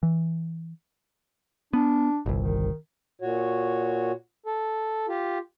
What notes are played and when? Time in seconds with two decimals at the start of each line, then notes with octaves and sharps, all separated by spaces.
0.03 E3
1.73 B3 D4
2.26 G1 C2
2.38 D#3
3.21 A#2 F#4 C#5
4.46 A4
5.08 F4 G4